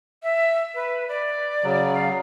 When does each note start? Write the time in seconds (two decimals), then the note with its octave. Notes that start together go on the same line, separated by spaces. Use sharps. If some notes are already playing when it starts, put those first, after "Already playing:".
0.23 E5
0.75 B4
1.08 D5
1.64 C#3 F#3
1.95 F5